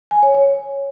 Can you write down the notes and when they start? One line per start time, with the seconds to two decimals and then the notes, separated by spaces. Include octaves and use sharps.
0.11 G#5
0.23 C#5
0.34 C#5